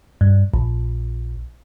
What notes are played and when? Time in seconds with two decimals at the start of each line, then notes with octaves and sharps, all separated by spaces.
0.21 G2
0.54 A#1